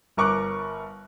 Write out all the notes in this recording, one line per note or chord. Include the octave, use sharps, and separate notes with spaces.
G1 A#4 C#6 D6 F#6